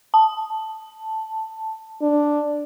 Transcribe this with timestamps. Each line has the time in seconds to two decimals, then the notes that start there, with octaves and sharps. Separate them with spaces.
0.14 A5
2.02 D4